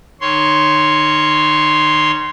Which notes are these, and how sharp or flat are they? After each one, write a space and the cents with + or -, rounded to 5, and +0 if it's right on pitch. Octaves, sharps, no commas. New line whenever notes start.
D#3 -25 C#5 +0 C6 +0